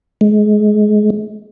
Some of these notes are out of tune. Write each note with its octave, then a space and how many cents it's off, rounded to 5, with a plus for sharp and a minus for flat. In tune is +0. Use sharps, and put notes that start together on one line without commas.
G#3 +25